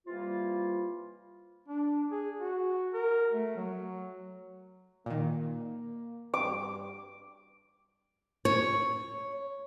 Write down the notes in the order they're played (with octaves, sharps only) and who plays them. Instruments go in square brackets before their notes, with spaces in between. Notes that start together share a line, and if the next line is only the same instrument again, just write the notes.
[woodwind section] C3 E3 G3 A#3 F4
[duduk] D4
G#4
F#4
A#4
A3
F#3
[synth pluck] A#2 D#3 [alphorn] A#3
[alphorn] G2 [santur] D6
[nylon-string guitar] C#5